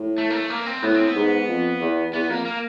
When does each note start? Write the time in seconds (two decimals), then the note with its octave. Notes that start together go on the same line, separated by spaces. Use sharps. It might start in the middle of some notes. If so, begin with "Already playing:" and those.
Already playing: A2
0.18 A3
0.30 A#3
0.34 A3
0.50 A#3
0.66 C4
0.83 A2 B3
0.94 C4
1.07 B3
1.16 G#2
1.48 F2
1.80 E2
2.13 E2 B3
2.29 F2 A#3
2.46 A#3